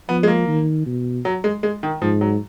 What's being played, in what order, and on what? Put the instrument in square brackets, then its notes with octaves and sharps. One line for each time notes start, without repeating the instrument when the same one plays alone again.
[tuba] F3 [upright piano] B3
[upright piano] G#3
A#3
[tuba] D#3
B2
[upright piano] F#3
G#3
G#3
D#3
[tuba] G#2 [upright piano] F3
[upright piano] F#3